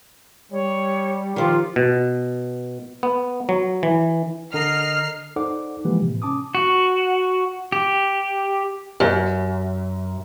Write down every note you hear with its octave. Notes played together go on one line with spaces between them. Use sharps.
G3 C#5
D#3 F3 F4 G4
B2
B3
F#3
E3
D3 A#4 D#5 F6 C7
D#4 A4 C5 D5 F#5 D6
E3 F3 G#3 A#3 G4 B4
A2 C3
C#4 A5 D6 D#6
F#4
G4
F#2